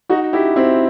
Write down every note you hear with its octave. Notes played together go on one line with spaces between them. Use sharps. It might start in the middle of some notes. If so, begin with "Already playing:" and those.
D#4 F#4
E4 G4
C4 E4